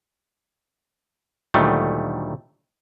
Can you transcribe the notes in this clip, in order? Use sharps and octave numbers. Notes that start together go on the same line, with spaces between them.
D2 A#2 D#3 F#3 G3 A3